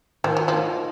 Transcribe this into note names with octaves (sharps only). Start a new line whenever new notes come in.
D#3 F3
F#3
F3 D#4